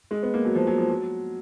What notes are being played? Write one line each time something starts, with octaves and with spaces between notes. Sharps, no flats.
G#3
B3
A#3
F#3
F3
F#3
F3
F#3